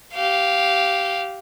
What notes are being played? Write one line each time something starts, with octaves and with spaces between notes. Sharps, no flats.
G4 F5